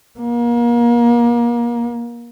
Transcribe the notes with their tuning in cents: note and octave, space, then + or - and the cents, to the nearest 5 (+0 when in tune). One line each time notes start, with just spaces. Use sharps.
A#3 +30